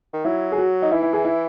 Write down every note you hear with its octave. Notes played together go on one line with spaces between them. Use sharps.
D#3
F#3 E4
G#4
F#4
D#4
E3 E4
E4
G#4
E4